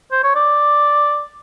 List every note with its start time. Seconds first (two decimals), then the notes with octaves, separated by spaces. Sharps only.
0.12 C5
0.24 C#5
0.35 D5